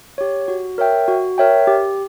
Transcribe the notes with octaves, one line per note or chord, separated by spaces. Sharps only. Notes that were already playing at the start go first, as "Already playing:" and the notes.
G4 C#5
F#4
A#4 C#5 E5 G5
F#4
A#4 C#5 E5 G5
G4